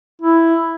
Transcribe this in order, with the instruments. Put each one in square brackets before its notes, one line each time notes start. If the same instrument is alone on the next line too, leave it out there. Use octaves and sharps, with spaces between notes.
[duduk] E4